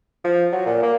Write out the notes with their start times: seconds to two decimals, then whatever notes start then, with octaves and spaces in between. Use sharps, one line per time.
0.24 F3
0.52 F#3
0.66 A#2
0.82 A#3